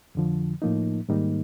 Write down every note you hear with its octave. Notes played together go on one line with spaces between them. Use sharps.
F2 D3 F3
A2 F3 A#3 D#4
G#2 D#3 G3 A#3 D#4